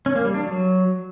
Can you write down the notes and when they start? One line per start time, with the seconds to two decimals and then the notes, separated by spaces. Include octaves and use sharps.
0.06 C#4
0.15 A#3
0.25 G3
0.34 D4
0.44 F#3